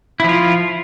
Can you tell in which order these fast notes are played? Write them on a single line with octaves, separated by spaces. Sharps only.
E4 F3 F4